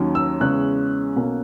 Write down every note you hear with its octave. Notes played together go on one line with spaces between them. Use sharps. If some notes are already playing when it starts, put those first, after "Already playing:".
Already playing: D#2 D#3 F#3 C#4
E6
E2 C#3 G#3 C#4 F#6
B1 B2 A#3 C#4